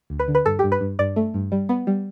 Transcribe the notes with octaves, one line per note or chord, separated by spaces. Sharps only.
D2
B4
D3
B4
G2 A4
G2 G4
B4
G2
G2 D5
A3
G2
G3
B3
G3